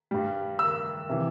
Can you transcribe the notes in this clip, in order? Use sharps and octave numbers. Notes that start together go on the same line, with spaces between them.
G2 G3
E6
C3 E3